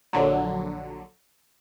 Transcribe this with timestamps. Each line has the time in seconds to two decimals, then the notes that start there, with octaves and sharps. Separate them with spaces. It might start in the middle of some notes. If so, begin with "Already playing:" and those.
0.13 A#1 D3 F#3